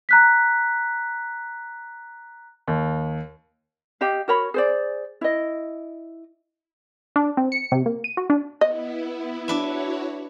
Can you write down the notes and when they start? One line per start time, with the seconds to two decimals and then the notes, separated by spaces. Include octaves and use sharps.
0.09 A#5 F#6 B6
2.68 D#2
4.01 G4 D#5 F5
4.28 F#4 A#4 C#5 B5
4.54 G#4 C5 D5
5.21 E4 D#5
7.16 D4
7.37 C4
7.52 C#7
7.72 C3
7.86 A#3
8.04 D#7
8.17 F#4
8.30 D4
8.61 B3 E4 D#5
9.48 D4 E4 F#4 B4 C#5 E5